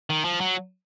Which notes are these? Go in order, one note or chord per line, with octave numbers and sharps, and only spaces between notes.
D#3
F3
F#3